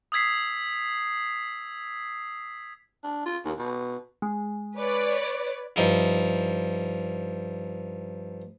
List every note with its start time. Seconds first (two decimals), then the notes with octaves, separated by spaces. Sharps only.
0.12 D#6 E6 G#6 B6 C7
3.03 D4
3.25 F4
3.45 D#2
3.58 B2
4.22 G#3
4.76 B4 C#5 D5
5.76 G2 F3 D#4 E4